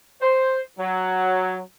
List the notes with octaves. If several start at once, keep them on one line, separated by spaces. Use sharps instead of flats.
C5
F#3